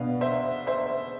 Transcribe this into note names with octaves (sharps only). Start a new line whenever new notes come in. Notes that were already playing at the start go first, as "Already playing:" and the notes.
Already playing: B2 B3 D4 F5
C5 E5
C5 E5